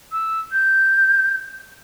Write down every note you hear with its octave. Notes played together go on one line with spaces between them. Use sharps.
E6
G6